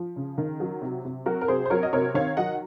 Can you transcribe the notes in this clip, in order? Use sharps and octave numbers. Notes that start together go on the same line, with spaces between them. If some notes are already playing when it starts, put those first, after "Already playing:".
Already playing: F3
C#3
D#3
F#3
C3
C3
F#3 F#4 A#4
A#4
C3 G#4 C5
C5
F#3 A#4 C#5
D#5
C3 A#4 C#5
D#3 C#5 F5
F#3 D#5 F#5